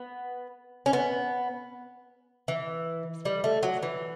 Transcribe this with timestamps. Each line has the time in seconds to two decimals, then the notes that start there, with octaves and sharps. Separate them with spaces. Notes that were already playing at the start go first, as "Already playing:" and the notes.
Already playing: B3
0.86 C#4
0.93 B3
2.48 E3
3.25 G3
3.44 A3
3.63 F#3
3.83 E3